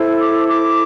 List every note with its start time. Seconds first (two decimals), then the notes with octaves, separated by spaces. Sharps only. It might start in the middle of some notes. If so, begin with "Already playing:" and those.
Already playing: E4 A4 C5
0.19 D6
0.48 D6